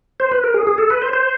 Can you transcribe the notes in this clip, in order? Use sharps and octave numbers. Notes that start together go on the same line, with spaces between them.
C5
B4
A#4
G#4
G#4
A4
B4
C5
C5